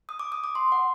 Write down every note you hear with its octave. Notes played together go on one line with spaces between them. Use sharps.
D#6
D6
D#6
D6
C6
F#5